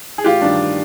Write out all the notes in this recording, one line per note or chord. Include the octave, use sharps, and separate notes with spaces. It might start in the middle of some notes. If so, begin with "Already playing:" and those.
G#4
A1 F4 G4
G2 D#3 D4